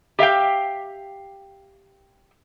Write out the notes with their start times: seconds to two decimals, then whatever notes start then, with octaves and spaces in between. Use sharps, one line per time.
0.19 G4 E5 F5 G5